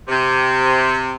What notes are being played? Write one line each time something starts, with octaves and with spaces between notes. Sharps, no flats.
C3